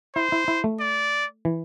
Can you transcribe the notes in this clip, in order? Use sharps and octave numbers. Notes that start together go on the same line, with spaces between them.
E4 C5
E4
E4
A3
D5
E3